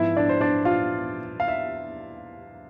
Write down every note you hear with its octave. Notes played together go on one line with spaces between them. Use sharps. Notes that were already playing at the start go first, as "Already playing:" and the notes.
Already playing: G#2 F3 B3 E4 E5
D4 D5
C5
D4 D5
F4 F5
F5
E5